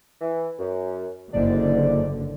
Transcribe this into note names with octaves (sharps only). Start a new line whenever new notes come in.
E3
F#2
F#1 G#2 D3 D4 D5